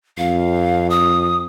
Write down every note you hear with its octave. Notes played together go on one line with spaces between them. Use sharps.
F2 F5
D#6